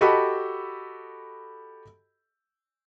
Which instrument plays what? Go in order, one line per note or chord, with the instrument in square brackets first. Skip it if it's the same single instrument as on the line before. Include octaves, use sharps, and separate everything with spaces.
[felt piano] F#4 G4 A4 D#5 B5